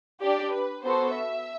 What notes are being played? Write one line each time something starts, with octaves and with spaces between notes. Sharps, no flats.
D4 G4 D5
B4
B3 F#4 A4 C5
E5